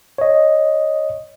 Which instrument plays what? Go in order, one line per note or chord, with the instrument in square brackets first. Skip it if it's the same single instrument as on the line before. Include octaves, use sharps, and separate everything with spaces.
[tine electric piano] C#5 D#5